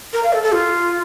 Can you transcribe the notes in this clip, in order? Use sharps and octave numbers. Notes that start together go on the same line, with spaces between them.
A#4
F5
A4
A4
F4